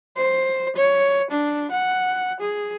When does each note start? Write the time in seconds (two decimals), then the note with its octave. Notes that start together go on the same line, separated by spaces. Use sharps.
0.17 C5
0.76 C#5
1.31 D4
1.71 F#5
2.40 G#4